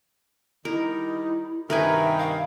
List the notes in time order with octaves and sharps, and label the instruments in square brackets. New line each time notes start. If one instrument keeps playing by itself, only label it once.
[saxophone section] D#3 G3 D#4 [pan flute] E4 [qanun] A#4
[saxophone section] G2 C3 D#3 [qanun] A#4 B4 G#5 [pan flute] E5
[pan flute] F5